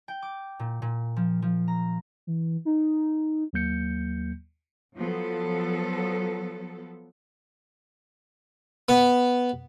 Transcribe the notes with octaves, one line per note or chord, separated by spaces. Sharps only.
G5
D6
A#2
A#2
F3
F3
A#5
E3
D#4
D#2 F#3 A#3 G6 C#7
F3 F#3 B3 A4
B3